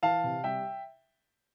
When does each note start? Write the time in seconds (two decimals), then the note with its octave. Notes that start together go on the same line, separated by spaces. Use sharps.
0.03 E3 F5 A5
0.24 C3
0.44 G3 E5 G5